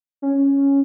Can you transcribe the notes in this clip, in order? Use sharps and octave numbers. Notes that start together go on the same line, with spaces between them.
C#4